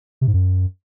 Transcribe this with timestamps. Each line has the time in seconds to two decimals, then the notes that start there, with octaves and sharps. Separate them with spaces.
0.21 C3
0.28 G#2
0.34 F#2